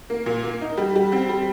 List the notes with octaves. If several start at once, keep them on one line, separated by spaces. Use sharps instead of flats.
A#3
A#2
A#3
D#4
G3
G3
C4
G3